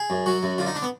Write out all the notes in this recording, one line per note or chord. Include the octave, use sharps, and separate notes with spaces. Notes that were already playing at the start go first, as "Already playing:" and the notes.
Already playing: G#4
F#2
F#3 F#4
F#2
D3 F4
D#4
D4
B3